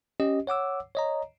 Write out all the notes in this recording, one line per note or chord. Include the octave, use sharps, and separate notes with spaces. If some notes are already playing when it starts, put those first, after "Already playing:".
C#4 G4 D#5
C#5 F#5 D6 E6
C#5 D#5 A#5